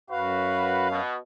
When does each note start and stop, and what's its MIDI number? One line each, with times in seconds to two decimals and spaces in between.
0.10 1.00 42
0.10 0.88 66
0.10 0.88 71
0.10 1.00 77
0.91 1.16 47